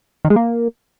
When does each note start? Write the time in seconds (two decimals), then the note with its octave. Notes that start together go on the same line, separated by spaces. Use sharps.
0.25 D#3
0.30 G#3
0.36 A#3